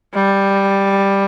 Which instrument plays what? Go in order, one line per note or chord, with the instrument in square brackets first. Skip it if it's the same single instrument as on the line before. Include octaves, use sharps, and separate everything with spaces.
[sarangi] G3